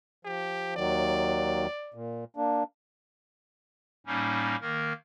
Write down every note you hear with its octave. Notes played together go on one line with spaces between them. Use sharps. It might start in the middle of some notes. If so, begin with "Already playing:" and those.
F3 G4
D#2 D#3 F#3 D5
A#2
A#3 D4
A2 G3 A#3 C#4 D#4
D#3 A#3 A#4